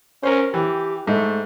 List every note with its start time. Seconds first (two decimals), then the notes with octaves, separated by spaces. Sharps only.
0.23 C#4 A#4 C5
0.54 E3 G4
1.07 G#2 A3